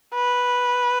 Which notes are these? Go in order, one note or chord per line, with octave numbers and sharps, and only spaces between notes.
B4